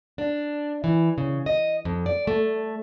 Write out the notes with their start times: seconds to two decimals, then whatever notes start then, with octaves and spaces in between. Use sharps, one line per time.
0.18 D4
0.84 E3
1.18 C#3
1.46 D#5
1.85 F2
2.06 D5
2.27 A3